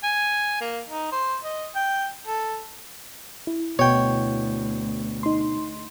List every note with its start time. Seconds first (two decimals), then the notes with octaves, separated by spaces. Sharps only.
0.04 G#5
0.61 A#3
0.88 D#4
1.12 C5
1.44 D#5
1.75 G5
2.27 A4
3.47 E4
3.79 D2 B2 C#5 G5
5.23 D#4 C6